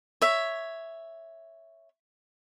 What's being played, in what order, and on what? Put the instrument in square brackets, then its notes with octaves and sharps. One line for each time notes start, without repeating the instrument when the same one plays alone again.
[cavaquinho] C#5 E5